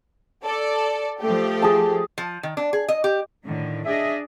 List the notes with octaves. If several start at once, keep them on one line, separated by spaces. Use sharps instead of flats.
A4 D5
F3 A3 G4
G#4 A5
F3
D#3
D4
G#4
D#5
G4
A2 D3 D#3
D4 G#4 D#5 E5